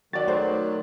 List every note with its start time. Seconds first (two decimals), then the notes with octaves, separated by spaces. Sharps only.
0.13 D#3 F#3 F#4 D5 A6
0.28 A3 C5